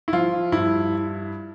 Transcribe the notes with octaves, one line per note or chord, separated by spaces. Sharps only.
E4
F3 F4
G2 E4